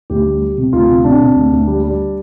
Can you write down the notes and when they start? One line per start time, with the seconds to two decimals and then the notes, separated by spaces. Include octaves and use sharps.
0.10 D2 G4
0.25 G3
0.42 G3
0.58 C3
0.73 D2 F4
0.89 C3
1.04 C3 D4
1.20 C3
1.36 D2
1.52 D2
1.67 G3
1.83 G3